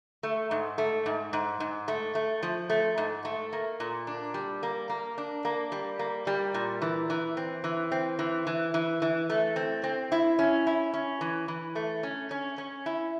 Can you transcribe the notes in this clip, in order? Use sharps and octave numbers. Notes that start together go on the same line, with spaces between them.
A3
G#2
A3
G#2
G#2
G#2
A3
A3
F3
A3
G#2
A3
A#3
A#2
D4
G3
A#3
A#3
D4
A#3
G3
A#3
G3
A#2
E3
E3
C4
E3
C4
E3
E3
E3
E3
A3
C4
C4
E4
C#4
E4
C#4
E3
E3
A3
C#4
C#4
C#4
E4